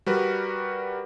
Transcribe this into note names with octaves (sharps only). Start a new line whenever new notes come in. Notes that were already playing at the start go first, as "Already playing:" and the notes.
G3 F#4 A#4 B4